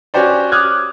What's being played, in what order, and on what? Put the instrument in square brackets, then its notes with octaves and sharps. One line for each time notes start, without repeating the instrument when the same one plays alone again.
[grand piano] C#4 F#4 G4 C5 D5
D6 D#6 F6 F#6 G#6